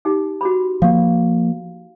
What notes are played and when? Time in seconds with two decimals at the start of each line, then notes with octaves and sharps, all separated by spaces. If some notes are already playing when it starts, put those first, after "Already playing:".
0.05 D#4 G4 G#4
0.41 F#4 G#4 B5
0.82 F3 A#3 F5